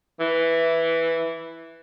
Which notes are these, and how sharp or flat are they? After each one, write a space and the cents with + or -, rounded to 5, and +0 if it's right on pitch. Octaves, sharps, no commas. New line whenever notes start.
E3 +0